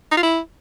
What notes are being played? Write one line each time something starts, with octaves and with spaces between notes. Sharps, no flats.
D#4
F4
E4